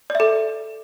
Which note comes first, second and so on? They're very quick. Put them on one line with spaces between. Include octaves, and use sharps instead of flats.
D5 E5 A4